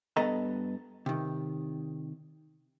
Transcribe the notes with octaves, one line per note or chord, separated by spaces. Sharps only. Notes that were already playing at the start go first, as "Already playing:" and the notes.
G2 B3 A4 D#5 A#5
C3 D#3